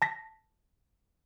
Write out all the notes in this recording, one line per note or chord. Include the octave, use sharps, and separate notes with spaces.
A5 A#6 B6